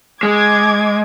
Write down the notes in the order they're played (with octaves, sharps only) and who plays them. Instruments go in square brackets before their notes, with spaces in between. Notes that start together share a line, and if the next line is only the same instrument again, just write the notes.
[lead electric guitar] G#3 [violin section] D6 G#6